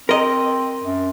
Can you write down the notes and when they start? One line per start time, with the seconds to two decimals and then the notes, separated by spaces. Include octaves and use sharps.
0.09 C4 A#4 D#5
0.85 F#2